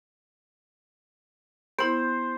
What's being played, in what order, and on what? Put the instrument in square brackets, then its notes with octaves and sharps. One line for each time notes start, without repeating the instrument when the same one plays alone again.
[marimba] B3 E4 [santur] C5